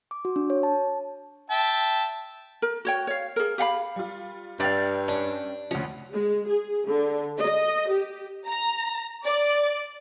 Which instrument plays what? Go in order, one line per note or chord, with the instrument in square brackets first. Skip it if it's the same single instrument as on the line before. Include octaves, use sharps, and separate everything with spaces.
[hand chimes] D6
F#4
D4
C#5
A5
[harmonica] E5 G5 A5
[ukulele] A#4
F#4 C#5 G5
C#5 F5
G#4 A#4
G4 F5 F#5 B5
[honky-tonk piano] G3 F4
[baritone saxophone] G2 [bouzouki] D5 F5 [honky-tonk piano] E5 G5
[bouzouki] C#4 [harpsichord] D4
[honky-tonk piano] D2 F3 [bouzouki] C#4
[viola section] G#3
G#4
D3
D#5
G4
[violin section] A#5
D5